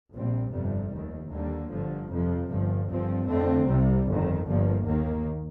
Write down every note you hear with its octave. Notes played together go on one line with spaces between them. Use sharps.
A#1 A#2 G3 C4
G1 F2 C3 G3
F1 D#2 D#3
D#2 D3 G3 A#3
G1 G2 D3 F3
F2 C3 F3
G1 G2 F3
G1 G2 F3 C4
F2 D3 A3 C4
C2 C3 G3
G1 F2 D#3
G1 G2 F3 A#3
D#2 D#3 A#3